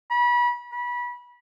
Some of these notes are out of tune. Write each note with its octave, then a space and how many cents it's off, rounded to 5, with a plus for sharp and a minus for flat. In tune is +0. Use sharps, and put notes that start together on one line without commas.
B5 -30
B5 -25